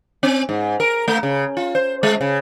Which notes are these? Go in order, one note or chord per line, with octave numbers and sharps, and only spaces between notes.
C4
G#2
A#4
A3
C#3
F4
C5
G#3
C#3